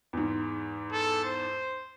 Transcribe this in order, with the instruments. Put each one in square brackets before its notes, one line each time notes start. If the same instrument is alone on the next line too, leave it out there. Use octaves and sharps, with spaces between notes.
[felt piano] E2 G#2
[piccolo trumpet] A4
C5